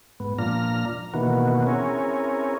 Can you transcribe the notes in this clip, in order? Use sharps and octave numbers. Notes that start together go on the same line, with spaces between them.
G#2 B3
A#2 F3 D4 A#5 F6
B2 D#3 E3 A#3 B3 F#4
C4 C#4 E4 G#4 A#4 C#5